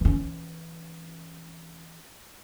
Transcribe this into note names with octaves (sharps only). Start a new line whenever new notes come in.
E3 C#4